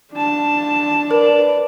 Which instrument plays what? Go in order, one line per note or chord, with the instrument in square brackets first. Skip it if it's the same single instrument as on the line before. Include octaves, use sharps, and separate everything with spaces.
[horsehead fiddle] D4 A5
[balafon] A#4 [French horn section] B4 [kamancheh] D5